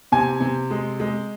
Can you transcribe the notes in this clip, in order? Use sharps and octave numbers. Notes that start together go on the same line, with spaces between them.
C3 G#5
C3
G#3
G#3